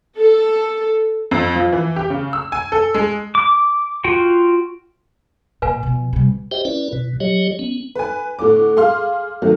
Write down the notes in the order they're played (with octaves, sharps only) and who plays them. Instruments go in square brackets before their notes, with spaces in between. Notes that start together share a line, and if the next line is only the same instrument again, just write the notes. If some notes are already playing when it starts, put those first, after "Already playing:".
[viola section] A4
[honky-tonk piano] F2
F3
E3
G4
C#3
E6
G#5
A4
G#3
[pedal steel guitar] D6
F4 F#4 G5
[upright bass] A#2 [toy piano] B4 G#5
[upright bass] B2 F3
C3 G3
[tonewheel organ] G4 C5 D#5 E5 G5
C#4 E4 B4 D5
B2
F#3 G4 C#5 D#5
B3 C#4
[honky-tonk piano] B4 G#5
A2 D3 D6
G#4 F5 C6 F6
D#3 F#3 A3